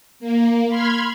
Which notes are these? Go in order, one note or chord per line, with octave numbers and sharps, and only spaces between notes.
A#3
B5 C6 F6 G#6